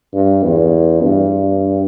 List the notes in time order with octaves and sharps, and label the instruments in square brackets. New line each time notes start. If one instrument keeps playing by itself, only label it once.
[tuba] G2
E2
G2